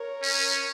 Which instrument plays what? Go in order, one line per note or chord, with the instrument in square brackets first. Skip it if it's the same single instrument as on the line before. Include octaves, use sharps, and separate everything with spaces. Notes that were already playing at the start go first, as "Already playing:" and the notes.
Already playing: [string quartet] A#4 C#5
[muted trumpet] C#4